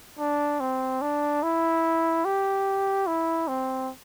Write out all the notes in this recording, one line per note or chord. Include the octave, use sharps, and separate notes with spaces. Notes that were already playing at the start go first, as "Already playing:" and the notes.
D4
C4
D4
E4
G4
E4
C4